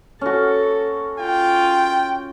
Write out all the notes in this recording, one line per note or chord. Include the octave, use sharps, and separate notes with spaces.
C#4 F#4 A4
F4 G5